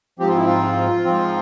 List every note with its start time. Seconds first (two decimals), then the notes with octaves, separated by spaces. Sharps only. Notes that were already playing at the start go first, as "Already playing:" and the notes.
0.19 G#2 F3 C4 G4
0.28 F4
0.37 E4
0.46 F4
1.05 G#2 F3 C4